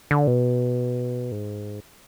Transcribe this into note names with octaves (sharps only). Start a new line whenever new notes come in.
D3
B2
G#2